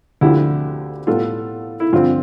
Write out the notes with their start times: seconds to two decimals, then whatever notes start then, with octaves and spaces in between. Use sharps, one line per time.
0.21 D2 D3 F3 E4 G4
1.07 A2 G3 B3 F4 A4
1.80 E4
1.92 G2 D3 F3 C4 F4